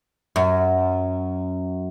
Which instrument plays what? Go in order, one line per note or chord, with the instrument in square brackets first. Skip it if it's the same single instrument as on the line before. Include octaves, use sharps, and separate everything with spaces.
[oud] F#2